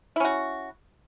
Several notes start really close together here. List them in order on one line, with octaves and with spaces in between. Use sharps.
E4 C#4 F#4